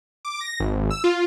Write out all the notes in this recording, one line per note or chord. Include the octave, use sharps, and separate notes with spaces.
D6
A#6
G#1
E6
F4